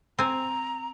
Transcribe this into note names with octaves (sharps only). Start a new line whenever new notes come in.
C4 G#5 A#5